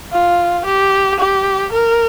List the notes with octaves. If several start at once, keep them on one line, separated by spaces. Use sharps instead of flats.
F4
G4
G4
A#4